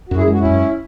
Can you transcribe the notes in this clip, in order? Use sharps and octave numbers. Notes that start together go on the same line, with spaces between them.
F#2 F#4
E4 G#4
G#3 F#4
C#4 E4
F#2